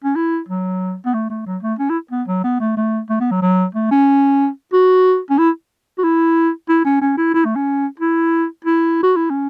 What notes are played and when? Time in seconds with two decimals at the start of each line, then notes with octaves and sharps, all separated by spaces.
0.04 C#4
0.16 E4
0.48 F#3
1.06 B3
1.14 A3
1.30 A3
1.46 F#3
1.62 A3
1.79 C#4
1.90 E4
2.11 B3
2.28 F#3
2.44 B3
2.60 A3
2.77 A3
3.09 A3
3.20 B3
3.31 F#3
3.42 F#3
3.75 A3
3.91 C#4
4.73 F#4
5.30 C#4
5.38 E4
5.98 F#4
6.04 E4
6.69 E4
6.85 C#4
7.01 C#4
7.17 E4
7.34 E4
7.45 A3
7.56 C#4
7.99 E4
8.65 E4
9.03 F#4
9.16 E4
9.30 C#4